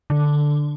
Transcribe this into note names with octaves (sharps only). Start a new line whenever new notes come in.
D3